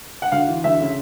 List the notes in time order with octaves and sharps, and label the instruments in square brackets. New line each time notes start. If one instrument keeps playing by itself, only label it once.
[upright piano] F#5
D2 F5
E3
D2 E5
C#3